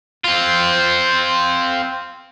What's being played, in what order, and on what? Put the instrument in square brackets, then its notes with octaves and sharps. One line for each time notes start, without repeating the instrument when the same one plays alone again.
[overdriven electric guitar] C4 F4